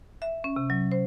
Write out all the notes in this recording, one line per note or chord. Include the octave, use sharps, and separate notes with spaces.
E5
C#4
C3
F#3
C5